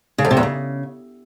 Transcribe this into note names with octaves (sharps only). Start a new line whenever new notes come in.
C#3
F2
C3
E2
C#3